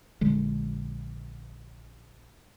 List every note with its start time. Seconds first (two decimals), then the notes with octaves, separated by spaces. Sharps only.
0.21 A#1 D3 G#3